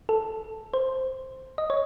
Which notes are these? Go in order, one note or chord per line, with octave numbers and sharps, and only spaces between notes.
A4
C5
D#5
C#5